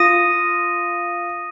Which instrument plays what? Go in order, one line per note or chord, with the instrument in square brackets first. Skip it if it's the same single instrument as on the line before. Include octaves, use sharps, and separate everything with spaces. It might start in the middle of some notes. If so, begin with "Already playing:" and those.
Already playing: [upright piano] F4 [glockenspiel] D#6 A#6 D#7